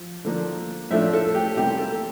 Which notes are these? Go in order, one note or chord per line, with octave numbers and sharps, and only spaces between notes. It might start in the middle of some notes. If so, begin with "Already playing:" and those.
Already playing: F3
D3 F3 A#3 D4
A2 F3 A3 D4 E5
A4
G4
C3 E3 G3 A#3 G4
A4